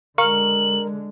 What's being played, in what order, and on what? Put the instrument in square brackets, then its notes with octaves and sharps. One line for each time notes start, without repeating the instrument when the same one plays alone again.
[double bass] D3 G#3 [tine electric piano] A#4 [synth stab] F5 C#6 [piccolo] F#7